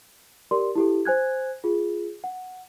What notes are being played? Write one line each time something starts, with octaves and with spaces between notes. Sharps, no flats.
G4 A#4 D5 C6
E4 G4 A4
C5 G#5 F#6 G#6
F4 G#4
F#5